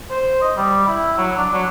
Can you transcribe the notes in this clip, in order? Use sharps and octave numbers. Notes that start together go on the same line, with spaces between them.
C5
D#5
G3
E4
F#3
D4
F#3